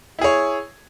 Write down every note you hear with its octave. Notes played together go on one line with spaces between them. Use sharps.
E4 G#4 C#5